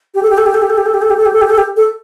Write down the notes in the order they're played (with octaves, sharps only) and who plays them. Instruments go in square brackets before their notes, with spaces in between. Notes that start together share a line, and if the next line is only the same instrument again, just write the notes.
[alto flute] G4
A4
G4
A4
G4
A4
G4
A4
G4
A4
G4
A4
G4
A4
G4
A4
G4
A4
G4
A4